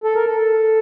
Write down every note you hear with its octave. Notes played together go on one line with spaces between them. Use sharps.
A4
A#4
A4